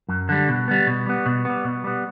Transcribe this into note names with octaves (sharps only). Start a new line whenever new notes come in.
F#2
D3 G3
B2
G3 B3
B2
G3 B3
B2
G3 B3
B2
G3 B3